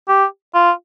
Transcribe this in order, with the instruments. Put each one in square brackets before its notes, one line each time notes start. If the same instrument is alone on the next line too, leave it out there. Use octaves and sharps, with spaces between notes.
[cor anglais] G4
F4